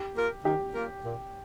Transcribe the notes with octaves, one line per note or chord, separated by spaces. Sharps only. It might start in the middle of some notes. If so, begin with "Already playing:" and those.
Already playing: G4
A#3 F4 A#4
D#3 G4
A#3 F4 A#4
A#2